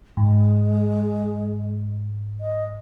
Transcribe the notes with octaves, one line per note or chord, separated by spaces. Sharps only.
G#2 G#3
D#5